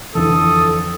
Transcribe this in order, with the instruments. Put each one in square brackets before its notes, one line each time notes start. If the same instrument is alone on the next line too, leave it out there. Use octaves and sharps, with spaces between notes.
[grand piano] F2 D3 E3 [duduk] A4 [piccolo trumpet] D#6